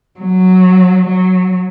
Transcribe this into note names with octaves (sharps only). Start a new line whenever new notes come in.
F#3
F#3